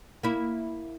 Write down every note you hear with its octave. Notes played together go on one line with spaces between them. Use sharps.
A#3 E4